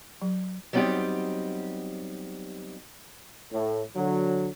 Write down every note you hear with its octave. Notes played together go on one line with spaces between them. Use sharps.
F#3
F#3 G3 B3 C4 D#4 G4
A2
D3 F#3